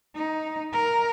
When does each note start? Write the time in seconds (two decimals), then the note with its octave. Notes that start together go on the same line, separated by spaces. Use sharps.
0.15 D#4
0.73 A#4